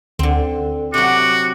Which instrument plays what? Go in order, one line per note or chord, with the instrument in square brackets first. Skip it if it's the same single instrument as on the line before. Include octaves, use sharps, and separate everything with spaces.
[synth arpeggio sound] D2 [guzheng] D3 C4
[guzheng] C3 F#3 [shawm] F#4 [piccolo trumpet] D6